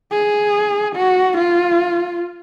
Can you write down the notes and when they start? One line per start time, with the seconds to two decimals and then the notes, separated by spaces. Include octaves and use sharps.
0.12 G#4
0.96 F#4
1.38 F4